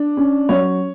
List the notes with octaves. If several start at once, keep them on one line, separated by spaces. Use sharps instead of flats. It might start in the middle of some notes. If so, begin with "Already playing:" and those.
Already playing: D4
C#4
F#3 C#5